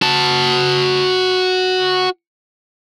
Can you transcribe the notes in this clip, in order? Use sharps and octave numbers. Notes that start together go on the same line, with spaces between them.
F#4 A5